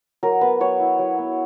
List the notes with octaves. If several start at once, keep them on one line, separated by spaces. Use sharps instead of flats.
F#3 A#4
B3 B4
F#3 C#5
E4
F#3
B3